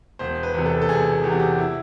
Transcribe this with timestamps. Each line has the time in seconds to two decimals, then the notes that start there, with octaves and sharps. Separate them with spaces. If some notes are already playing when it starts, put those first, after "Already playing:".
0.19 E1 C5
0.43 B4
0.54 E2 C3
0.66 A4
0.82 A4
0.89 E1 G#4
1.23 E2 C3 G4
1.32 F#4
1.39 G4
1.59 E4